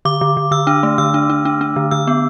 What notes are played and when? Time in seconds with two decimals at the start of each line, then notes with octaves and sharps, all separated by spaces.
0.05 D3 D6
0.21 D3
0.37 D3
0.51 D3 E6
0.67 D4
0.83 A3
0.98 D3 E6
1.14 D4
1.30 D4
1.45 D4
1.61 D4
1.76 D3
1.91 D3 E6
2.07 B3